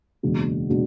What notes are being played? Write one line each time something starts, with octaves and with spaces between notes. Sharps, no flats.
F#1 E2 B2 G#3 D4
B2 G#3 D4